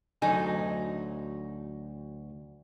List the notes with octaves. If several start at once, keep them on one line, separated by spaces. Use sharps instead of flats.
D2 F#3 D#4 A4 G#5